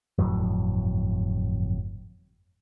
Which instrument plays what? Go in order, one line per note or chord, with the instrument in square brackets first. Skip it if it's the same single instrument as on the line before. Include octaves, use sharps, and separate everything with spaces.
[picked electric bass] G1 F2 A2 F#3